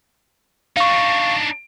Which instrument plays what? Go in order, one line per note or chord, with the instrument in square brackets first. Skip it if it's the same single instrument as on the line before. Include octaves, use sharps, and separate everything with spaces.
[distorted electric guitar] D4 D#4 [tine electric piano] F5 C#6